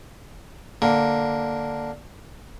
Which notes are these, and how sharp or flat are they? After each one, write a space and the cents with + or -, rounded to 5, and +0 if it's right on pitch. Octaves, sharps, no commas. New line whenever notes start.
D3 +0 A#3 +0